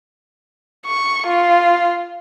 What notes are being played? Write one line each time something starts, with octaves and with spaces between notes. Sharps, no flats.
C#6
F4